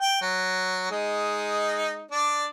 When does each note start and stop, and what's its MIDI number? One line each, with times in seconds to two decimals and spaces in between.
0.01 0.21 79
0.22 0.87 54
0.91 2.05 56
0.91 2.05 63
2.11 2.46 62
2.11 2.46 74